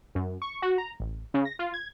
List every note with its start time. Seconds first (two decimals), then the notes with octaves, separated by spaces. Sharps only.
0.15 F#2
0.42 C#6
0.62 F#4
0.78 A#5
1.00 A1
1.34 C#3
1.45 A#6
1.59 F4
1.74 G#6